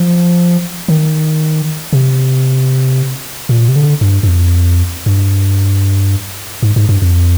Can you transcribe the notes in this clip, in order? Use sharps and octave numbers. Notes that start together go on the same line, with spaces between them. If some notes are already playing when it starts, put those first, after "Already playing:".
Already playing: F3
D#3
C3
A#2
C3
D3
G2
G2
F2
G2
G#2
G#2
G2
F2